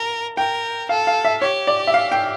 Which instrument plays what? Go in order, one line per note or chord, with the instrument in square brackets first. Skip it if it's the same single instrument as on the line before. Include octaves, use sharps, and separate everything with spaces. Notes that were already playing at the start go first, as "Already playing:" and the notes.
Already playing: [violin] A#4 [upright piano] A5
[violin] A#4 [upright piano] G5
[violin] A4 [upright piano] F5
[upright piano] F5
E5
[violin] G4 [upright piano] C#5
[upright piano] D5
E5
F5
G5